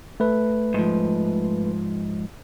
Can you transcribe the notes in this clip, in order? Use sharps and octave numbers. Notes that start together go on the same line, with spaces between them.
A3 B4
G#2 F3